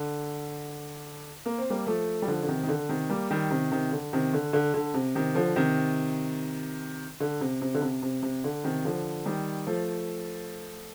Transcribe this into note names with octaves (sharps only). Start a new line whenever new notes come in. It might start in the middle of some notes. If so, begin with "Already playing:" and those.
Already playing: D3
A#3
C4
G3 A#3
F3 A3
G3
D3 F3
D3
C3 D#3
D#3
D3
C3 D#3
G3 A#3
D#3 G3
C3 D#3
C3 D#3
D3
C3 D#3
D3
D3
D3
C3
C3 D#3
D3 F3
C3 D#3
D3
C3
C3
D3
C3
C3
C3
D3
C3 D#3
D3 F3
D#3 G3
F3 A3